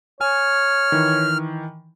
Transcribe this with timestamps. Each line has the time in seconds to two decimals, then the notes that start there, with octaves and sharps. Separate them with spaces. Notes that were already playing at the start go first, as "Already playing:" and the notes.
0.21 C#5 G#5 F6
0.92 D#3 E3